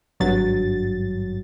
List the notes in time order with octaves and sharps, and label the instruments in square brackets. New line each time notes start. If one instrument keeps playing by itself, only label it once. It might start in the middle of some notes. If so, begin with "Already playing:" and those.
[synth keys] G#1 G2 F#3 A6